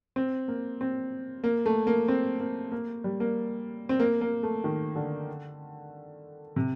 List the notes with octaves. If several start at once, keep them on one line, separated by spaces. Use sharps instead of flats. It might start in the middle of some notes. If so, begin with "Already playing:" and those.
C4
A#3
C4
A#3
A3
A#3
C4
A#3
A#3
G3
A#3
C4
A#3
A#3
A3
D#3
D3
C3